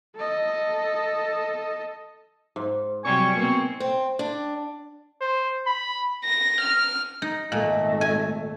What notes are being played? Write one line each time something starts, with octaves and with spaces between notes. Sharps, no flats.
A4 D#5
G#2
C3 F#3 G3 G#5 C#6
B2 A#3 C4
C4
D4
C5
B5
A#6
F6
D#4
G#1 A#2 A3 D#5
G#5